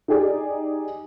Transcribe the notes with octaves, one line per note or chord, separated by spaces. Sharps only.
D#4 G4 G#4 D5